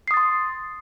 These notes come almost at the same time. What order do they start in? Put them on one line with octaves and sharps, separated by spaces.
C7 D#6 A6 C6